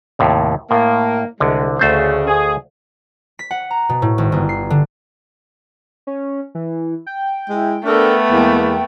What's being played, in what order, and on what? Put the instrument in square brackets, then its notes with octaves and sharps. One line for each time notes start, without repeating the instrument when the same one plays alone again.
[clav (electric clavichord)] D#2 A2 C3
[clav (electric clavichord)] A2 [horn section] A#3
[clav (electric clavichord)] C2 D3 [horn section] G#3
[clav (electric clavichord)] D2 A3 C5 [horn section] C#3
[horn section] G#4
[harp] B6
F#5
A#5
B2
A2
G#1
G1
C7
D3
[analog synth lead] C#4
E3
G5
[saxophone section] G#3 E4
[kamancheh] A3 B3 [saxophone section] D4 A4 A#4
[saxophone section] E2 G#3 A#3